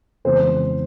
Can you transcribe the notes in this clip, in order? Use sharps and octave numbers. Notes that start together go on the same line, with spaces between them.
F2 C#3 E3 G#3 B3 C5